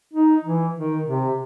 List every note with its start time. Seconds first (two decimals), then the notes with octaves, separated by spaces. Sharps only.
0.14 D#4
0.45 E3
0.76 D#3
1.06 C3